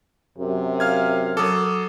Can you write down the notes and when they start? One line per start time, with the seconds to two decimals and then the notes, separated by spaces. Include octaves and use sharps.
0.38 F#2 C3
0.80 F5 F6 G#6
1.37 F#3 A4 D6 D#6